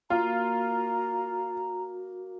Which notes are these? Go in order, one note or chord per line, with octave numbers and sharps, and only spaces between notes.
A#3 F4 F#4 A#5